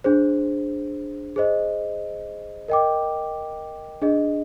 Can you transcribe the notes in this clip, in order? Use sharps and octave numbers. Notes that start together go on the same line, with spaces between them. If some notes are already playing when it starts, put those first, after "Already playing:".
D4 G#4 C5
G#4 C5 D#5
A#4 D#5 G5 D6
D4 G#4 D#5